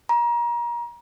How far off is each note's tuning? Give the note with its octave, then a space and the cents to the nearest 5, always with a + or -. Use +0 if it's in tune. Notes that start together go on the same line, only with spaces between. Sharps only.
A#5 +30